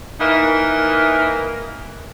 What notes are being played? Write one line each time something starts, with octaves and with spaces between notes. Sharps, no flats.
E3 A#3 D#4 A#4